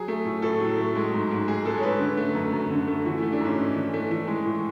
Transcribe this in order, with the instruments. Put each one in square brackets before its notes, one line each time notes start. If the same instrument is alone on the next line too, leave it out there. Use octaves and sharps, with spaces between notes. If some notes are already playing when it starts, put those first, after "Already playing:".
Already playing: [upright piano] F#3 G#4
A3
A2
A2 A4
F#3
A3
G#3
G#2
G#2
G#3 G#4
G#3 A4
C#5
G#2 B4
D3
A3
F#2
F#2
D3
A3
E3 F#4
E4
A3
D4
G#2 C#4
G#2
E3
A3
E3
G#3
A2